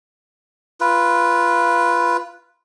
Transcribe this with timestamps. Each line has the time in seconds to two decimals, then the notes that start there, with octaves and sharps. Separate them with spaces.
0.81 F4 B4